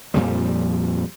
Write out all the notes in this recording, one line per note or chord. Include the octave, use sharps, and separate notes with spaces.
F2 A#2 F3 G3